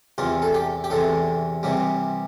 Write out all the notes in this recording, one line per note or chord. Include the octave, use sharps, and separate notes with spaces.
E2 C3 E3 F4
A4
G4
G4
E2 C3 E3 A4
C2 C3 E3 G3